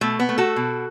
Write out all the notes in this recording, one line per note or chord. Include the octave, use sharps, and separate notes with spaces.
B2 A3
B3
A3
F#4 A4
B2